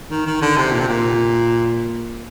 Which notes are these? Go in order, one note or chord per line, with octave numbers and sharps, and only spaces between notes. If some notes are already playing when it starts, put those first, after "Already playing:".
D#3
D#3
D3
C3
A#2
C3
A#2